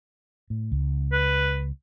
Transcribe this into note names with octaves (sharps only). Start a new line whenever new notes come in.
A2
C#2
B4